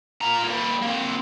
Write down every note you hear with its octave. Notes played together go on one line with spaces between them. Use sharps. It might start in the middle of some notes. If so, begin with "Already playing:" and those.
F4 A#5
G3 A#3
A#3 C4